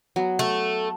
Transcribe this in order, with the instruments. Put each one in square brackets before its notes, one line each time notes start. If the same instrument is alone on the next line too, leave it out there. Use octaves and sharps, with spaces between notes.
[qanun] F#3 B3
[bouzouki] A3